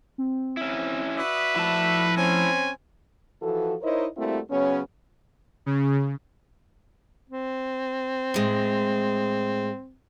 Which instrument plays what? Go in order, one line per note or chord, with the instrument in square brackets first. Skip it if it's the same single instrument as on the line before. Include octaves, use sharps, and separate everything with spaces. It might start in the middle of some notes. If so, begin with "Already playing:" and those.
[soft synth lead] C4
[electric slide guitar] C#4 E4
[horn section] F#4 D5 E5 [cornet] B4 [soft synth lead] D#6
[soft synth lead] F3 [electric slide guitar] E4 A5
[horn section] C4 C#4 [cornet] G#5
[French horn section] E3 F3 F#4 A4
D#4 E4 A#4 C5 C#5 D#5
G3 A3 A#3 C4 E4 F#4
C#3 F#3 B3 C#4
[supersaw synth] C#3
[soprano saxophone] C4
[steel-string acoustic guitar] A2 G#3